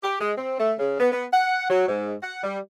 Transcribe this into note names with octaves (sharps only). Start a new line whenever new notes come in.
G4
G#3
C4
A3
C#3
B3
B3
F#5
F#3
G#2
F#5
G3